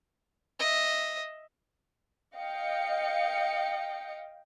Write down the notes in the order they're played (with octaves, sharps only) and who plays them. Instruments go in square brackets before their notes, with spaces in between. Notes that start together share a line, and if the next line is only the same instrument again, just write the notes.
[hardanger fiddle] D#5 E5
[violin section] D#5 F5 G5 C#7